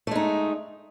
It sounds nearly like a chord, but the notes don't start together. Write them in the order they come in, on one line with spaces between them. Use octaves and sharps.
A3 G#3 D#4